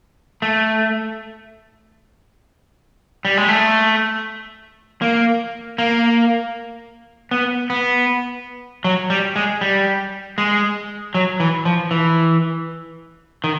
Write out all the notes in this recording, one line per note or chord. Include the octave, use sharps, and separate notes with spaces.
A3
G3
G#3
A3
A#3
A#3
B3
B3
F#3
G3
G#3
G3
G#3
F#3
E3
F3
E3
D#3